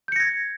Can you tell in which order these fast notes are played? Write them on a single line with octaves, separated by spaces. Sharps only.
G6 C#7 A#6 G#6